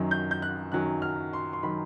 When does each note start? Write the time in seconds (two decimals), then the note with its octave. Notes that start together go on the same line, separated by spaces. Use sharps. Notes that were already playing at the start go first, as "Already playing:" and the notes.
Already playing: F#2 D#3 F#3
0.11 G6
0.31 G6
0.42 F#6
0.72 F#2 D#3 F#3 F#6
1.02 F6
1.33 C6
1.53 C6
1.63 D#3 F#3 B5